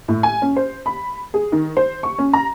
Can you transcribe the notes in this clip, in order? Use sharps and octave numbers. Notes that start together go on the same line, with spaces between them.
A2
G#5
C#4
C5
B5
G#4
D#3
C5
C#6
C#4
A#5